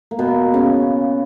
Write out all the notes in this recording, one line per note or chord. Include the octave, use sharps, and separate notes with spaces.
A#3
B2 B3
C#3 C#4